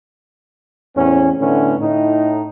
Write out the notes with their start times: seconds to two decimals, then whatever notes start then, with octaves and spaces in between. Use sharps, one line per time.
0.96 E2 A2 C4 C#4
1.40 A2 D3 A3 B3 C#4
1.79 A2 D#4